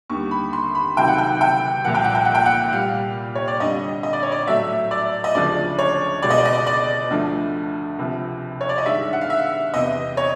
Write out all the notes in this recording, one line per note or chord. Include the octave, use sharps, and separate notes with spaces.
D#2 D3 G3 C#6
B5
C6
B5
C#2 C3 D#3 F#3 G5
F#5
G5
G5
C2 A#2 F3 F#5
G5
F#5
G5
F#5
G5
F#5
A#2 G3 F5
C#5
D5
F2 D3 G3 D#5
D#5
D5
C#5
D5
A2 F#3 A3 E5
D5
D#5
D2 C#3 F3 G#3 D5
C#5
C#2 B2 G#3 D5
D#5
D5
D#5
D5
D5
D2 D3 F3 A3
C#2 C3 F3
C#5
D5
D#5
G2 D#3 G#3 E5
F#5
F5
E5
E2 C3 E3 D#5
C#5